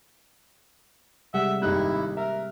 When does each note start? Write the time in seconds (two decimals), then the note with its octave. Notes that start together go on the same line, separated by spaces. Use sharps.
1.34 C3 G3 G#3 E5 F#5
1.62 G#1 A#3 D#4 E4 G4 A4 F#6
2.17 A#4 E5